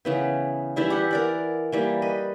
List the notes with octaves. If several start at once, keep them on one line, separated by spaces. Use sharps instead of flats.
C#3 E3 B3
E3 G3 E4 G#4
G4 F#5
A#4 D5 F#5
E3 G3 A#3
B4 D#5